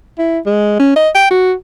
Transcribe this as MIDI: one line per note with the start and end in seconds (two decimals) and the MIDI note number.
0.18 0.39 64
0.46 0.78 56
0.79 0.93 61
0.96 1.09 75
1.15 1.29 79
1.31 1.53 66